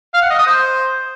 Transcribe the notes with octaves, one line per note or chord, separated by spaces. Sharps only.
F5
F#5
D#5
D#6
C5